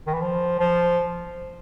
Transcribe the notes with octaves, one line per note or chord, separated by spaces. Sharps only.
D#3
E3
F3
F3